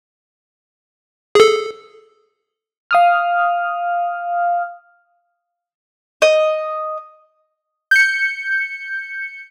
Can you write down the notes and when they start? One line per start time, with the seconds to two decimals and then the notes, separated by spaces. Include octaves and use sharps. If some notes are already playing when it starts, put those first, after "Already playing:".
1.35 G#4 A4
2.91 F5 D#6 F6
6.22 D#5
7.91 G6 C#7